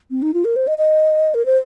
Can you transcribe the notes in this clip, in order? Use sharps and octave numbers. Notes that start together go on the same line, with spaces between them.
C4
D#4
F4
A#4
C5
D#5
D#5
A#4
C5